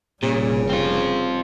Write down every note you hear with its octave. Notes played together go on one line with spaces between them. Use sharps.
F1 A#2 C#3 G3
C4 F4